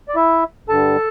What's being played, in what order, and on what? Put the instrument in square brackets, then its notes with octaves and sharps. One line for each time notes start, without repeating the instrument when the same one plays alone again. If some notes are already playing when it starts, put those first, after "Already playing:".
[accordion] D5
E4 E5
G2 D3 G3 A4 A5